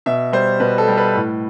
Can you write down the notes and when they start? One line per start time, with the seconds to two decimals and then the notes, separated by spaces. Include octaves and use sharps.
0.06 B2 E5
0.32 G3 C5
0.60 B2 B4
0.78 A4
0.88 G3
0.97 B4
1.15 A2